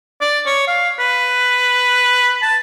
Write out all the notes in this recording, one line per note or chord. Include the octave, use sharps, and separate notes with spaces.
D5
C#5
F5
B4
A5